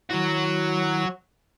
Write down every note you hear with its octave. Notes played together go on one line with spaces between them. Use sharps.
D#3 F#3 E4 F#4